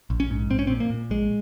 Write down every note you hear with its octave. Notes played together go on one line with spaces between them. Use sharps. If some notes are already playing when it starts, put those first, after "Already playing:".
A#1
C#4
G#2
A#1 C4
C#4
C4
A#2
A#3
A#2
A#1 G#3